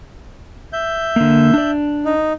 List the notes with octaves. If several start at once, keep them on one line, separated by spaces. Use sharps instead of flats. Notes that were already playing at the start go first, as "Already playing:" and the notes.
E5 G6
D3 A#3
D4 D5
D#4